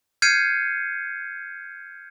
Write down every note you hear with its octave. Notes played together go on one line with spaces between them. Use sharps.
F6 G6 G#6 C7 C#7 D#7